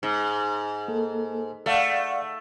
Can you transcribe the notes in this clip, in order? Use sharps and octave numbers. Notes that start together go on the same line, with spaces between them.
G#2
A#3 A4
A3 D5 F5 F#5